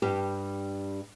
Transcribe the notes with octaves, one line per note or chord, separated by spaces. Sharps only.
G2 G3 G4